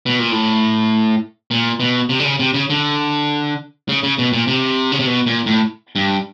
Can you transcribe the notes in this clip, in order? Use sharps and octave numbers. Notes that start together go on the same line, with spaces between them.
B2
A#2
A2
A#2
B2
C3
D3
C#3
C3
C#3
D3
C#3
C#3
B2
A#2
C3
C#3
C3
B2
A#2
A2
G2